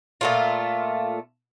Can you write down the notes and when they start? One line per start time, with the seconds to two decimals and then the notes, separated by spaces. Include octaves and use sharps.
0.21 A#2 A3 F4